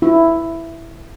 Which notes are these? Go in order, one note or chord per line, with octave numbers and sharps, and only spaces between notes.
E4